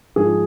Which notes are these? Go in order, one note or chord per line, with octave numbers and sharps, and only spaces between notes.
G#2 F3 G#4